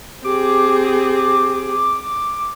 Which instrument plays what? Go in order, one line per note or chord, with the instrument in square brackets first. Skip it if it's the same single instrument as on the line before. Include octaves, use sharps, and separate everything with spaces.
[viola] C4 G#4 [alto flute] G4 [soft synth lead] D6